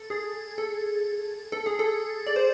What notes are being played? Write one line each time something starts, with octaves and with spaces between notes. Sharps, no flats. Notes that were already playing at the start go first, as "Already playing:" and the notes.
Already playing: A4
G#4
A4
A4
G#4
A4
D5
C5